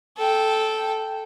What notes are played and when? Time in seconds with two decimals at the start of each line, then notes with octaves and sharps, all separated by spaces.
0.17 A4 G5